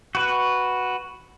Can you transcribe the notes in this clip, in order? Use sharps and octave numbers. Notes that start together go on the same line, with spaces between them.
F#4 B4